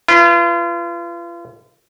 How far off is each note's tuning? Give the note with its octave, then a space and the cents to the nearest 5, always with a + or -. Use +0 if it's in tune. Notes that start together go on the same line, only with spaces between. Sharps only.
F4 -35 B4 +0